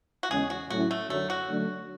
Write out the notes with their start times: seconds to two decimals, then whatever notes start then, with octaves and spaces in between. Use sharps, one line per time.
0.23 F#4
0.30 E2 C#3 G#3 C#4 G#4
0.50 F#4
0.70 A2 F#3 C#4 E4 F#4
0.91 A3
1.10 F#2 D3 F#3 A3
1.30 F#4
1.50 D3 F#3 A3 D4